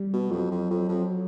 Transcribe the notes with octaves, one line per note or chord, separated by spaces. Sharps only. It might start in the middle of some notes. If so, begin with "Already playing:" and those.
Already playing: G3
B2
F2 F#3
F2
F2
F2